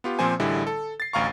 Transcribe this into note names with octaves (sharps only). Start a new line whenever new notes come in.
B3 F4 G4
A#2 F3 A#3 C4 C5 G#5
A1 D3 G3 E4 G#4
A4
A6 C7
A1 D2 F5 A#5 C#6